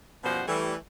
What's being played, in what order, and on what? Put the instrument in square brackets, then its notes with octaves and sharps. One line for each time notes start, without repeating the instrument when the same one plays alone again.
[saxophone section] F#2 B2 F3 G3 C5 F#5
E3 G3 A3